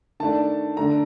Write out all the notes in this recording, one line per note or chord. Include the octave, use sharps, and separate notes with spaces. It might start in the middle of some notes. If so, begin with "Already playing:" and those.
D#3 A3 D4 A5
D3 A3 D4 A#5